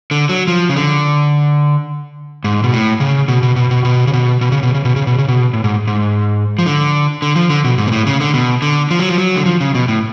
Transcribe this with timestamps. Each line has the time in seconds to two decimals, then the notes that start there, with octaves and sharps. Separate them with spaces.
0.11 D3
0.29 F#3
0.48 F3
0.69 C#3
0.77 D3
2.44 G#2
2.64 B2
2.73 A2
3.00 C#3
3.28 B2
3.43 B2
3.56 B2
3.71 B2
3.85 B2
4.07 C#3
4.13 B2
4.41 B2
4.52 C#3
4.63 B2
4.74 C#3
4.85 B2
4.96 C#3
5.07 B2
5.18 C#3
5.28 B2
5.53 A2
5.64 G#2
5.87 G#2
6.59 F3
6.66 D3
7.22 D3
7.36 F3
7.50 D3
7.64 B2
7.78 G#2
7.87 B2
7.92 A2
8.07 C#3
8.21 D3
8.34 B2
8.62 D3
8.91 F3
8.99 F#3
9.09 F3
9.18 F#3
9.36 D3
9.46 F3
9.61 C#3
9.75 B2
9.88 A2